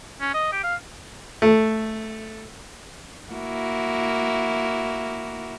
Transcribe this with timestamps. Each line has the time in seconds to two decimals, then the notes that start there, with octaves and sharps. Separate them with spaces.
0.20 C#4
0.34 D#5
0.52 G4
0.64 F5
1.42 A3
3.33 A#3 E4 F#4